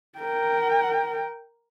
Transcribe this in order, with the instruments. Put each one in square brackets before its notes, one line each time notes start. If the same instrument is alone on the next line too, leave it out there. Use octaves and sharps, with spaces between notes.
[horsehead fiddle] A#4 G5